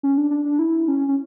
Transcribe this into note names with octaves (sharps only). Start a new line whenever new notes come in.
C#4
D4
D4
D4
E4
C#4
C#4